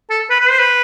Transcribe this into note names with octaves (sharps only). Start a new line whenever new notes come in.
A4
B4
B4
C5
B4